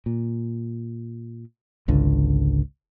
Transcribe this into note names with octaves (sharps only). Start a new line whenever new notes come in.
A#2
G#1 C#2 D3